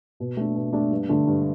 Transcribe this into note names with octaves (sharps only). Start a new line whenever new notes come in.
B2
A3 D4
B2
A3 D4
G2
D3 A3
G2